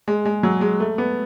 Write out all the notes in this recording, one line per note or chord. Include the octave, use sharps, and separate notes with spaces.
G#3
G#3
F#3
G#3
A3
B3